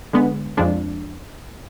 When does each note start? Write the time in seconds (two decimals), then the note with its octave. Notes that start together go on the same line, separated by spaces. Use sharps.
0.13 D3 G#3 B3
0.57 F2 F3 G#3 D4